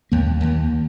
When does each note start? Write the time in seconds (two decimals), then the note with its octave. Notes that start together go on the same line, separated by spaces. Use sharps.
0.12 D#2 A#3
0.40 D#2